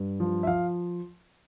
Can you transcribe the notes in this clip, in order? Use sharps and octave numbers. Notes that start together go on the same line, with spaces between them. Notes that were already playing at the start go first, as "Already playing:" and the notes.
Already playing: G2
F3
E5
F3 F5